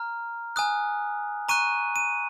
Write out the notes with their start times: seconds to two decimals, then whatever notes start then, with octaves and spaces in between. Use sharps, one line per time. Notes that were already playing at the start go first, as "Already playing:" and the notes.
Already playing: A#5 F6
0.56 G#5 D#6 F#6
1.49 A#5 C#6 F#6 D#7
1.96 D#7